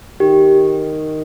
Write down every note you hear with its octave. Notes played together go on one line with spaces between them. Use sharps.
D#3 G4